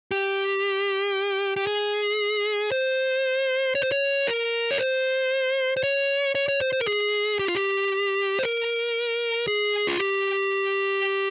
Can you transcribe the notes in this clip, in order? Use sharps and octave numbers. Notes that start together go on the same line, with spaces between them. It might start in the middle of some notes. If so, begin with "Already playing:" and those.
G4
G4
G#4
C5
C#5
C5
C#5
A#4
C#5
C5
C5
C#5
C#5
C#5
C5
C5
A#4
G#4
G4
F4
G4
C5
A#4
G#4
F4
G4